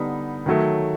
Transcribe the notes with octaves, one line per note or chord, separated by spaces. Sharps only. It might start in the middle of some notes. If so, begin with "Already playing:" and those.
Already playing: D3 G3 B3 D#4
D#3 F#3 A3